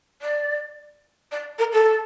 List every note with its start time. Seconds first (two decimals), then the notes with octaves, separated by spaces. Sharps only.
0.21 D5
1.31 D5
1.58 A#4
1.72 A4